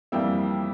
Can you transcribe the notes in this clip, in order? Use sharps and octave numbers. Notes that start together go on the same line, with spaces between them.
F2 E3 G3 A#3 E5 G5